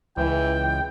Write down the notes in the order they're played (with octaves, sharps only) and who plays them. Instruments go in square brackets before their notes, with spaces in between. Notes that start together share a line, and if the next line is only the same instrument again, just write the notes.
[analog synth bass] C#2 [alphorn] E3 [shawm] G5